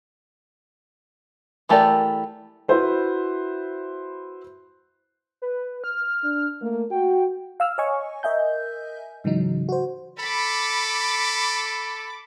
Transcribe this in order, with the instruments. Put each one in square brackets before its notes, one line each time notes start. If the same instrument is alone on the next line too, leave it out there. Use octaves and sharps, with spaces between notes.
[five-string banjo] E3 A3 G4 A#4 D5
[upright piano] E4 F#4 B4 C5 E5
[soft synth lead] B4
F6
[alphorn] D4
[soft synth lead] A3 [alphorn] A#3
[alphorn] F#4 [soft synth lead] G5
[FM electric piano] F5 E6 F6
C#5 D#5 G#5 C#6
A#4 D#5 E5 G#5 G6
G#2 C#3 E3 F#3 D#4
F#4 C5
[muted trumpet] A4 [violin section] B5 D6